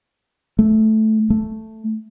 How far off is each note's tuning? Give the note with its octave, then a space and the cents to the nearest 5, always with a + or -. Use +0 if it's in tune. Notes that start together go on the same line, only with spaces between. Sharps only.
A3 -10
A3 +0